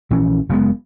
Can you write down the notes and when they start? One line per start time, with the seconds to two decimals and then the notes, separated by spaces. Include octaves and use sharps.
0.10 A#1 E3 C#4
0.49 F#1 C#3 G#3 B3